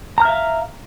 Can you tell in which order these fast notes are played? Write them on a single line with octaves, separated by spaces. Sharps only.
A#5 F6 E5 F5